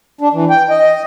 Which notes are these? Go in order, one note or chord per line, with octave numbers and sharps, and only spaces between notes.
D4
E3
G5
D#5